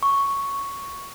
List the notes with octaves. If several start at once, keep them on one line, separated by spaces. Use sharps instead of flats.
C#6